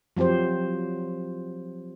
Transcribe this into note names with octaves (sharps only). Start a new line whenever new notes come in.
F3 F#3 C4 G4 C5